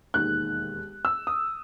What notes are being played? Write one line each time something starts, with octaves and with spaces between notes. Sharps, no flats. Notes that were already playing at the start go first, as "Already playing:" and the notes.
E1 D#2 D#3 F#6
E6
D#6